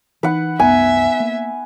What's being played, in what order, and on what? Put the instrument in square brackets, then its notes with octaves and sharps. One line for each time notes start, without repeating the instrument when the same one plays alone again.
[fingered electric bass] E3 [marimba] D#4 [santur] B4 F#5
[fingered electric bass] C2 F#2 [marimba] B3 A#5 [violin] E5 [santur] G#5
[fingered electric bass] A#3